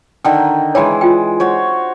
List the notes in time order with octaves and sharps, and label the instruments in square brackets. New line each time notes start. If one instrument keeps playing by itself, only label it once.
[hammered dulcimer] D3 D#3 D#4 [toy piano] G5
[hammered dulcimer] E3 G#3 [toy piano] C#5 G5 B5
[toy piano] F4 G5
[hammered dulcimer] F#4 C5 C#5